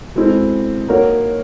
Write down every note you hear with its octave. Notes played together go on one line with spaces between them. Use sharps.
B2 G#3 C4 E4 A4
A#3 D#4 F#4 A#4 C#5